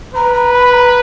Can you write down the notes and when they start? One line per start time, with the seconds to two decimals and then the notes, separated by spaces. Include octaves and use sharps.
0.14 B4 A#5
0.34 A#5
0.53 B5
0.73 A#5